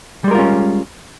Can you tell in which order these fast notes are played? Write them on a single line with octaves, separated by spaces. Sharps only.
G3 G#3 A#4 F4 C#4